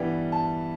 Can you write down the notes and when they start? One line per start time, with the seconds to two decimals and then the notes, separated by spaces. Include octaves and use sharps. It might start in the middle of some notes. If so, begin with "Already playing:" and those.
Already playing: G2 E3 G3 B3 G5
0.32 A5